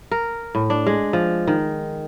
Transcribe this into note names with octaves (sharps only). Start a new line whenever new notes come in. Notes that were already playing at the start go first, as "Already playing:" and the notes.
A#4
A2
D4
G#3
F3
D#3